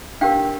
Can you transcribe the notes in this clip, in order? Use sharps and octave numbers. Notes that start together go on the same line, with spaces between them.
D4 G4 A#4 F5 G5